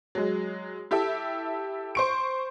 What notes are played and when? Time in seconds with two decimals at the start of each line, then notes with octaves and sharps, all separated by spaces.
0.15 F#3 G#3
0.91 E4 G4 A4 E5
1.95 C5 C#6 D7